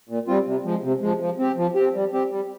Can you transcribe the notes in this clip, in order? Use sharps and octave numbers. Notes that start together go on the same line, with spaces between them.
A#2
G3 C4 F4
C3
F3 G#3
C3
F3 G#3
F3
C4 G4
F3
C4 G4
G3
C4 G4
G3